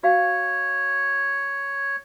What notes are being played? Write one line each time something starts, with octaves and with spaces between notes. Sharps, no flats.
F#4 C#5 F5